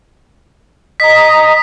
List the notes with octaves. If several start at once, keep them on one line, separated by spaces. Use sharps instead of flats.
D#5 A#5 B6